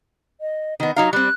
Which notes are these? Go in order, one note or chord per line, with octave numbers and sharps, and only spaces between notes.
D#5
D#3 B3 D#5
F#3 D#4 F5 A#5
G3 C4 F#6